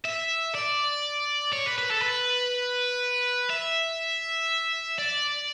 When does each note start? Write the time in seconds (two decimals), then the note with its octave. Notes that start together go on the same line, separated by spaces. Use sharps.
0.05 E5
0.55 D5
1.53 C#5
1.66 B4
1.78 B4
1.91 A4
2.02 B4
3.50 E5
4.99 D5